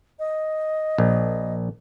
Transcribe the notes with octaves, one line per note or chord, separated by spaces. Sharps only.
D#5
A#1